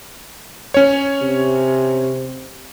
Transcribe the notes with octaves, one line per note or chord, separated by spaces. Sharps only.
C#4 C#5
C3